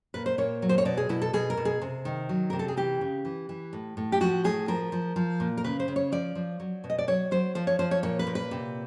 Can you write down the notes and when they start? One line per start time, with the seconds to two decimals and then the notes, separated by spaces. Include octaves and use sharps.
0.14 A#2 B4
0.26 C5
0.38 A#2 C#5
0.62 F#3
0.69 C5
0.78 C#5
0.85 B2 D5
0.97 G#4
1.09 B2 E4
1.22 A4
1.33 B2 G#4
1.50 A#4
1.57 B2
1.65 G#4
1.82 C3
2.05 D#3
2.29 F#3
2.50 C3 A#4
2.59 A4
2.68 G#4
2.77 E3 G4
3.01 C#3
3.25 E3
3.49 E3
3.73 A2
3.97 A2
4.12 G4
4.21 F3 F#4
4.44 A2 G#4
4.68 F3 A#4
4.92 F3
5.16 F3
5.40 A#2
5.57 A#4
5.64 C#3 B4
5.80 C5
5.88 C#3
5.96 C#5
6.12 F3 D5
6.35 F3
6.60 F#3
6.84 B2
6.90 D#5
6.98 D5
7.08 F#3 C#5
7.31 F#3 C5
7.55 F3 C5
7.67 C#5
7.79 F3 C5
7.91 C#5
8.03 A#2 C#5
8.19 B4
8.27 A#2
8.35 B4
8.51 C3